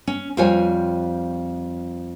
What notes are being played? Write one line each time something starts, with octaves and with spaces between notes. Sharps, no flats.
C#4
F2 G3 F4 C5 C#5 G#5